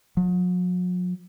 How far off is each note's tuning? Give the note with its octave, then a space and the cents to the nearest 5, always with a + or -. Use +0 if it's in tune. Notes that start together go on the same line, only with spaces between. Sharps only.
F#3 -45